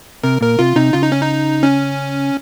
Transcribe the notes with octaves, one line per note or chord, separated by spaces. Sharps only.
C3 A#4
A#2 A#4
C3 F4
C3 D#4
C#3 F4
D#4
C#4
D#4
C#4